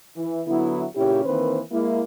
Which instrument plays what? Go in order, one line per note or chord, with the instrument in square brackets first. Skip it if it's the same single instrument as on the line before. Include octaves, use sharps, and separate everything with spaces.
[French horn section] E3
D3 F#3 B3 E4
A#2 C#3 C#4 E4 G4
D#3 E3 A#3 C4 B4 C5
G#3 A#3 E4